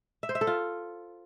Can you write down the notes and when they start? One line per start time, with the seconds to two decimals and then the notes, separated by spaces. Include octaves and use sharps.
0.23 E5
0.29 C5
0.35 E5
0.41 A4
0.47 F4